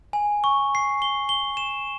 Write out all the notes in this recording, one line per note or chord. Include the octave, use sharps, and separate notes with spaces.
G#5
C#6
C7
G7
G7
E7